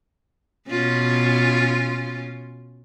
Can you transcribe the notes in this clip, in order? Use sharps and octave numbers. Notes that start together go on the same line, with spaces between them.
B2 C#4 F4